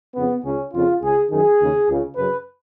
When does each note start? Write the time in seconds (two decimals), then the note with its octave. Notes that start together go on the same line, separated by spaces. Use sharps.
0.15 F2 C#3 B3
0.44 C#2 C#3 C#4
0.72 F2 C#3 F4
1.01 C#2 C#3 G#4
1.30 F#2 D#3 G#4
1.59 D#2 C#3
1.87 C#2 C#3
2.16 F#2 C#3 B4